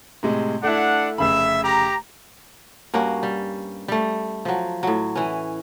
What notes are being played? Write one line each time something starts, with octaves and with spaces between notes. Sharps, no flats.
A2 C3 G#3
A3 D4 E4 F#5
F1 C#3 E5 B5
G4 A#5
G2 A#3 C#4 F#4
G3
G3 A3
F3 F#3
A2 F#3
E3 C#4